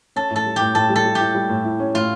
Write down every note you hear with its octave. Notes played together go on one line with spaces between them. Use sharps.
C#4 A4
A2
A4
G3
A2 G4
A2 A4
G3
A4
G3
E4 G4
G3
A2
E4
C#4
A2 F4